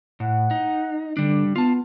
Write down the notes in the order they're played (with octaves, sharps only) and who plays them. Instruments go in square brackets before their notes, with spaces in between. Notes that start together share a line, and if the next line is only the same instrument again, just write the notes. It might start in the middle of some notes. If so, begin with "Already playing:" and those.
[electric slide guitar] A2 [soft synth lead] F#5
[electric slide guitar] D#4
[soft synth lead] D3 [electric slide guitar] G3 D4
[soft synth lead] B3 [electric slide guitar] F4 A5